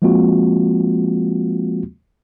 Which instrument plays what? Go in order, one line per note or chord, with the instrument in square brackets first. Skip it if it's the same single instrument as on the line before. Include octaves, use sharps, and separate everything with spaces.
[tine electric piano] F3 G#3 A#3 C4 F4 F#4